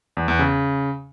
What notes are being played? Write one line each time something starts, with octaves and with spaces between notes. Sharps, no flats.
E2
E2
C#3